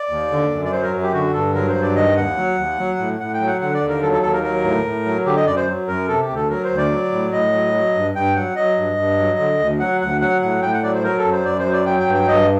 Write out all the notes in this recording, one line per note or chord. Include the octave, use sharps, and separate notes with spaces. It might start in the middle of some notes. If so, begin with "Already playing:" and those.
Already playing: D5
D#2
D3
F#2
D5
F#3 C5
A#4
F#2
G4
D3 F#4
G2 A4
F#3 A#4
C5
G2
D5
D#3 D#5
D#2 F#5
F#3
D#2
F#3
A2
A2 F#5
G5
F#3
F#5
D3 F#5
D5
D#2
A#4
F#3 A4
A4
D#2 A4
A#4
F#3 A#4
A2
A2
F#3
D3 G4
D#5
F#2 D5
C5
F#3
F#2 A#4
C3 A4
G4
D2
A4
F#3 A#4
C5
D2
D5
F#3
A2
A2 D#5
F#3
F#3
G2
G2 G5
F#3 F#5
F#3 D#5
G2
G2
F#3
D3
D2
F#3 F#5
D2 F#5
F#3 F#5
A2 F#5
A2 G5
F#5
F#3 D5
C5
F#3 A#4
A4
F#2
C5
F#2 D5
C5
F#3
D5
F#3 G5
G5
G2
G5
G2 D#5